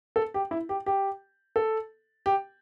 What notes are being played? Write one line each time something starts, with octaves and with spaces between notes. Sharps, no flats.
A4
G4
E4
G4
G4
A4
G4